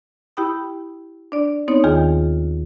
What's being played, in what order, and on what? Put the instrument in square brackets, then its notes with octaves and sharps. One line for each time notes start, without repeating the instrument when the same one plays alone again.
[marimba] E4 G4 G5 B5 D#6
D4 D5
B3 C4 D#4 C#5
D#2 D#3 F4 G#4 G#5